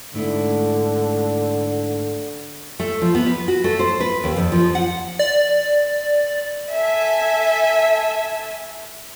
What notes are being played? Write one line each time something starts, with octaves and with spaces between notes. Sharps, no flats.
G#2 D3 A3 E4
A3
F3
B3
B4
F#4
A3
C5
B4
D#2
F2
F3
F#5
D5
A4 E5 G#5